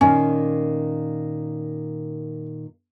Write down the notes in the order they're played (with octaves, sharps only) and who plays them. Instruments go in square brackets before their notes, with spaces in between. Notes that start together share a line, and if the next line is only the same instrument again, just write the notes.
[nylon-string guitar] A#2 D#3 A#3 [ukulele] C#4